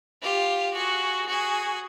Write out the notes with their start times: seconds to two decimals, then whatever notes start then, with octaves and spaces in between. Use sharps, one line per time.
0.22 F4 G4
0.75 F#4 G#4
1.28 F#4 G#4